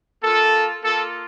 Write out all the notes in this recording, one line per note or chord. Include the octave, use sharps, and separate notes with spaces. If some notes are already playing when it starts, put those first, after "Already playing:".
A#3 F4 A4
A#3 F4 A4